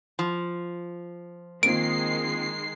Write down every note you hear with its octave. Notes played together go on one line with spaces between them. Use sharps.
F3
D#3 G#3 A#3 C4 F4 C7 D7